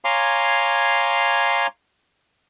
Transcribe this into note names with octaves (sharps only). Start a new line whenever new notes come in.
C#5 F5 G#5 A#5 C6 D6